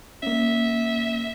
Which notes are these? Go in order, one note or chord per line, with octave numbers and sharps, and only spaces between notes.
A#3 C#4 E5